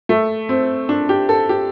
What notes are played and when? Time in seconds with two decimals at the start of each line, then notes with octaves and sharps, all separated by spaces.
0.09 A3
0.49 C4
0.89 D4
1.09 G4
1.29 A4
1.49 G4